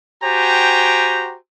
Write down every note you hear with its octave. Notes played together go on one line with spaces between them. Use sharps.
F#4 G4 C5 G5 G#5 A#5